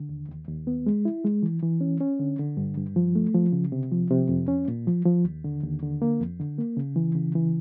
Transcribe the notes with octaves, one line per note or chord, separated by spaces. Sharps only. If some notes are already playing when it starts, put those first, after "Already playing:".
Already playing: D3
D#2
D#2
D#2
B3
G#3
E4
G#3
E3
E3
C#4
C#4
D3
D3
G2
G2
F3
A3
F3
C#3
C3
F3
C3
F2
C#4
A#2
F3
F3
D#2
D3
D#2
D3
A#3
F2
D3
A#3
C#3
E3
C#3
E3